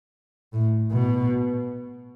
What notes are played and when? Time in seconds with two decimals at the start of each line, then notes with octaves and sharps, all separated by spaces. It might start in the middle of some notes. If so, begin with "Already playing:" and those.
0.53 A2
0.91 B2